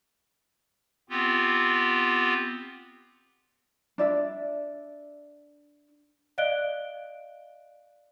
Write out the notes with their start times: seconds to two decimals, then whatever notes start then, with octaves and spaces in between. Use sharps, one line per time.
1.09 B3 C4 F4 G4
3.98 D4 D5 E5
6.38 D5 D#5 F5 F#6 D7 G7